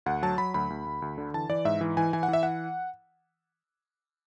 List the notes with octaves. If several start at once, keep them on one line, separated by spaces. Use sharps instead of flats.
D2 F#5
F#3 A5
F#3 B5
D2 B5
D2
D2
D2
D3
E3 A5
E3 D5
G#2 E5
E3
E3 G#5
E3 G#5
F#5
E3
E5
F#5